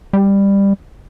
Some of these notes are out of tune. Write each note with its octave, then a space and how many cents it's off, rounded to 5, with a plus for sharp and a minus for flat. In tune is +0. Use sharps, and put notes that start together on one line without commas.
G3 +15